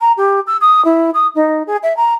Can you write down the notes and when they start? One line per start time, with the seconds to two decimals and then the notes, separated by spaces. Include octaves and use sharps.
0.01 A#5
0.17 G4
0.47 E6
0.61 D#6
0.85 E4
1.14 D#6
1.35 D#4
1.67 G#4
1.83 E5
1.97 A#5